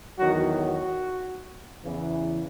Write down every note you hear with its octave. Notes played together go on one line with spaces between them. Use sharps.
E2 D#3 F#3 F#4
F#4
E2 C#3 E3